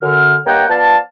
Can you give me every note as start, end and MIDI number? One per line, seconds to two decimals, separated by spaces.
0.03 0.37 42
0.03 0.37 50
0.03 0.37 89
0.47 0.65 43
0.47 0.65 58
0.47 0.65 73
0.47 0.65 75
0.47 0.65 78
0.47 0.65 79
0.69 0.97 53
0.69 0.97 59
0.69 0.97 74
0.69 0.97 77
0.69 0.97 81